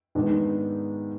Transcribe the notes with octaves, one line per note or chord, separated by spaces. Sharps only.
G#2 D#3 G#3 B3 D4